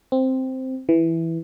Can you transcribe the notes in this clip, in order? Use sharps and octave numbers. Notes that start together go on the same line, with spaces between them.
C4
E3